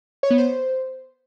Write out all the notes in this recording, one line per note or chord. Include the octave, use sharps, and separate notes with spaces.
C#5
B3
C5